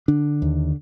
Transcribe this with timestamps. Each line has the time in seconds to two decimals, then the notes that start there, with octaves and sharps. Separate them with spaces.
0.08 D3 D4
0.42 D#2